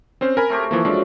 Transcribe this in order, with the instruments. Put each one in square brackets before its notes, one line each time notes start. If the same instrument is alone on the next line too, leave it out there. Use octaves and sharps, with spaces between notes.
[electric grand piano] C4 C#4 C5
A#4 G#5 B5
[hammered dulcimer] A3 C4 G4
[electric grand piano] E3 F3 A#3
[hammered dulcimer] F#2 [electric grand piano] F3 G#3 D4